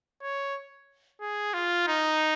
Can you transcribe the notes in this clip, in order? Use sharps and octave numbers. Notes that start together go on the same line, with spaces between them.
C#5
G#4
F4
D#4